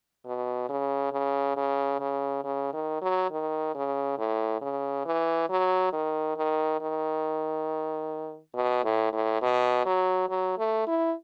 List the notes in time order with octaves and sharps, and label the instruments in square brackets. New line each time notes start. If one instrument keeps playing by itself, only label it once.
[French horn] B2
C#3
C#3
C#3
C#3
C#3
D#3
F#3
D#3
C#3
A2
C#3
E3
F#3
D#3
D#3
D#3
B2
A2
A2
B2
F#3
F#3
A3
E4